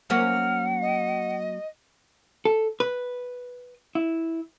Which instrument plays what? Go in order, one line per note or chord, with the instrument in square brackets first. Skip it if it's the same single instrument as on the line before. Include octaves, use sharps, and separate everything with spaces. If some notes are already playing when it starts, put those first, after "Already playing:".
[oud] F#3 A#3 C#4 [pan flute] F#5 [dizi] F6
[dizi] D#5
[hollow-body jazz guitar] A4
B4
E4